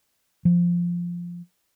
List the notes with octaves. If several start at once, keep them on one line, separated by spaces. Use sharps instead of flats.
F3